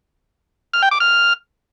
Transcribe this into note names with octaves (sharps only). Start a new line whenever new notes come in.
F6
G5
D6
F6